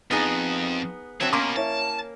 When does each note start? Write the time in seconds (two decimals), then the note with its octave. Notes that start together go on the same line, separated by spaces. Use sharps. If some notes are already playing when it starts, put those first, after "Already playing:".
0.11 F2 B3 D#4 G#4
1.21 D3 F#3 C4 C#5 E5 A5 G#6
1.33 B2 A#3 C#4 A#5 C6 D6
1.56 E4 C#5 E5 A5